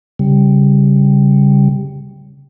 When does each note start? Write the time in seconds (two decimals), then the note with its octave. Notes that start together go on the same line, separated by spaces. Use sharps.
0.19 C#3 G3